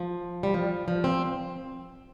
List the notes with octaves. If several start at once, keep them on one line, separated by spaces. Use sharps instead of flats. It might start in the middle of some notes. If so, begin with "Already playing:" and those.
Already playing: F3
G3
F3
F3
C4